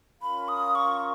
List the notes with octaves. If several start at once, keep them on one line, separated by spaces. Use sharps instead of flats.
C#4 F4 A#4 F5 B5
D#6
C#6